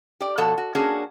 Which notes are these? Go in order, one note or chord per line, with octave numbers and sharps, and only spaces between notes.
G4 D5
B2 F3 F#4 A4 F#5
F#4
A#3 C#4 D4 F#4 G#4